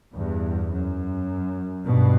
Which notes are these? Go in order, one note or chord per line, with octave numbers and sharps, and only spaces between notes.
E2 G2
F#2
G2 B2